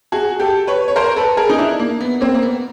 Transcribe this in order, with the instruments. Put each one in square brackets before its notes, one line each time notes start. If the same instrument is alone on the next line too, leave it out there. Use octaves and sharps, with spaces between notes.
[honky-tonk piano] F#4 G#4
G4 A4
B4 C#5
C#5
A#4 C5
A4 B4
G#4 A#4
D#4
D4 E4
A#3
B3
A#3 C4
A#3
B3